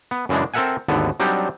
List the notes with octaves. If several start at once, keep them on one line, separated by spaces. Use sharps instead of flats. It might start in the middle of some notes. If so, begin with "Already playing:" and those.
B3
F#2 C#3 E3 G#3 D4
C4 A4 A#4 E5 F#5 G#5
G#1 D#2 D3 B3 A4
F#3 G3 C4 D4 D#4 G4